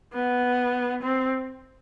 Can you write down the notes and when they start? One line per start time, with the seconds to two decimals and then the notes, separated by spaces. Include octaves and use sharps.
0.13 B3
1.02 C4